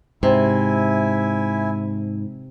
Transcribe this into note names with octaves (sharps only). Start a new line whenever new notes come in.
G#2 C3 E4 E5 G#5